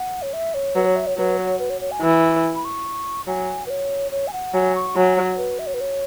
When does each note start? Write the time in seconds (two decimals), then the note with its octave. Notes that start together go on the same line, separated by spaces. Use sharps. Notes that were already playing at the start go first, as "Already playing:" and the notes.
Already playing: F#5
0.22 C#5
0.33 E5
0.54 C#5
0.75 F#3 B4
0.86 C#5
0.96 E5
1.07 C#5
1.17 F#3 B4
1.39 C#5
1.59 B4
1.70 C#5
1.81 C#5
1.91 G#5
2.02 E3
2.56 B5
2.65 C#6
3.27 F#3 G#5
3.66 B4
3.70 C#5
4.12 C#5
4.28 G#5
4.33 F#5
4.54 F#3 G#5
4.75 C#6
4.96 F#3 G#5
5.17 C#5
5.38 B4
5.59 E5
5.67 C#5
5.74 B4
5.81 C#5